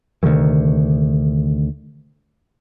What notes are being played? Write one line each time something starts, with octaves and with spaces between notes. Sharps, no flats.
D2 C3 D#3 E3